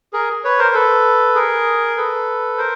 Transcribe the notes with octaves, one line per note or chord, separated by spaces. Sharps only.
G#4 A#4
B4 C#5
A#4 C5
A4 B4
G#4 A#4
A4 B4
A#4 C5